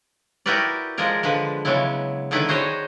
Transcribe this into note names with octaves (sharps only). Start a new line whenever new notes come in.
E4 F#4 G4 A#4 B4 D5
F3 G#3 G#4 A#4 D5
D3 F3 G#3 B4
C#3 F#3 G#3 B3 E4
D3 D#3 B3 E4 B4
F#4 G#4 C5 C#5 D#5